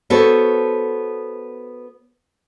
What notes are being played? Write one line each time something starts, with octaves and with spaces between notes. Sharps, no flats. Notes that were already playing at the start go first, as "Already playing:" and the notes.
B3 F#4 A4 C5 C#5